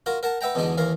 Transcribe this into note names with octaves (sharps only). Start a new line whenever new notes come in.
F4 F#4 A#4
A#4 F#5 A5
B4 E5 F#5 G5 A#5
E2 B2 D3 G#3 D4 D#4
D#2 E3 A#4 F5